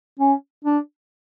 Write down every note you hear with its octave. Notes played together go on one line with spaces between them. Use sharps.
C#4
D4